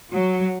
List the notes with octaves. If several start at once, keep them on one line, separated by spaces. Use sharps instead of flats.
F#3